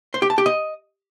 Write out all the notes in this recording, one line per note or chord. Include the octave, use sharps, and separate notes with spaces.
C5
G4
A5
G4
D#5